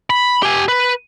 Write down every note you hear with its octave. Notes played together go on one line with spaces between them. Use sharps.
B5
G4 G#5
B4